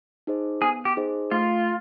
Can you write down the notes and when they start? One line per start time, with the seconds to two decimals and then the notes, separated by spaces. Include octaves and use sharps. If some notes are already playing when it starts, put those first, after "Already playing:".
0.27 D#4 G#4 C5 D#5
0.62 B3 G#4
0.85 G4
0.97 D#4 G#4 C5 D#5
1.31 A3 F4